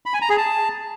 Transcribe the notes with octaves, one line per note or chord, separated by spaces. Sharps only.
B5
G#5
A#5
G#4
A5